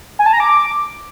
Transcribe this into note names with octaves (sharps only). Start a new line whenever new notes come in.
G#5
A5
A#5
D6